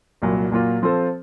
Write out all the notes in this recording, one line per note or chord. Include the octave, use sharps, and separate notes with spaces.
C2 A#2 F#3
A#2 F#3 A#3 F4
F3 C4 F4 A4 C5